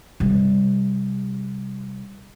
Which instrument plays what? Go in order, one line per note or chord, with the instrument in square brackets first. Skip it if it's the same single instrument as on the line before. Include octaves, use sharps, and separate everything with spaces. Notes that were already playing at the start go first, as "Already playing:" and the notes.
[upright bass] C3 G3